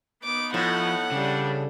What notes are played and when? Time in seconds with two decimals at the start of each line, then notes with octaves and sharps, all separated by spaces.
0.24 B3 D#4 D6
0.54 A2 F3 F#5
1.11 C#3 G3 D4